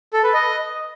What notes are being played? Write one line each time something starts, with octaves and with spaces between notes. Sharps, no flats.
A4
B4
D#5